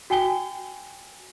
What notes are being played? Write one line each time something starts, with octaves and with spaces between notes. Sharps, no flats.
F#4 G5 G#5 G7